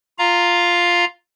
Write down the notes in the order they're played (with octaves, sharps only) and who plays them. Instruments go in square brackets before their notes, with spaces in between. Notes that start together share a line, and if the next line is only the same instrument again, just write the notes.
[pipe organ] F4 F5 A#5